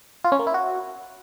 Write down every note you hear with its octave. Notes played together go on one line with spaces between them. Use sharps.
F4
C#4
A#3
E4
F#4